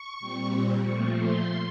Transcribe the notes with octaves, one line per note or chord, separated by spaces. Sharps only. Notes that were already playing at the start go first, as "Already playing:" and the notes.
Already playing: C#6
A#2 G3 C4
A#2 F3 A3 C#6
C6